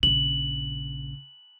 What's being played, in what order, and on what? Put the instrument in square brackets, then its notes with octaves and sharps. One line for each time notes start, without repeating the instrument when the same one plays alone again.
[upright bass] A#1 C#3 [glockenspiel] F#7